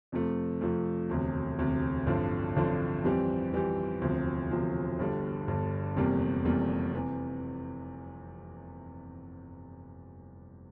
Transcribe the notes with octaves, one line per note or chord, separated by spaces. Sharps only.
F2 C3 F3 A3
F2 C3 F3 A3
E1 D2 C3
E1 D2 C3
A1 G2 D3 F3 C4
A1 G2 D3 F3 C4
F2 E3 G3 C4 G4
F2 E3 G3 C4 G4
E1 D2 C3 F3 C4
E1 D2 C3 F3 C4
G1 G2 D3 G3
G1 G2 D3 G3
F1 E2 C3 G3 A#3
F1 E2 C3 G3 A#3
C3 E3